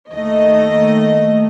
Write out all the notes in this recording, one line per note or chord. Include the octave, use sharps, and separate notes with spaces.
D#2 D#3 A3 D#5